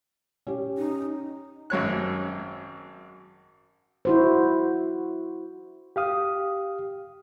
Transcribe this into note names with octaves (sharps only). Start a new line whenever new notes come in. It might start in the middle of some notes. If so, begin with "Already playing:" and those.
C#4 G4
D#4
G#1 F#2 C#5 F#6
E4 F#4 C5
G4 F5 D#6